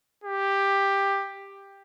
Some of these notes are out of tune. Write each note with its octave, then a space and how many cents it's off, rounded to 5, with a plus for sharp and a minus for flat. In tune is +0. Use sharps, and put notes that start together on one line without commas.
G4 +10